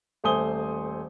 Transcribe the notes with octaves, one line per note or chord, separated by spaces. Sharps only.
D#1 A3 C5 G#5 D#6 G7